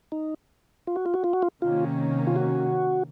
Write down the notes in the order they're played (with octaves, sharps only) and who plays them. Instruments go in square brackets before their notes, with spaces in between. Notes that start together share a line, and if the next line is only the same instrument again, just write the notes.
[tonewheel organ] D#4
F4
F#4
F4
F#4
F4
F#4
F4
[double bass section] C3 D#3 A#3 C#4 [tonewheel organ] F4
[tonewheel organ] F4
F#4